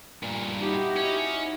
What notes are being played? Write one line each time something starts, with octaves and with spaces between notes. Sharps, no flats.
G2 A#2
D#4 E4 F#4 G4
C#4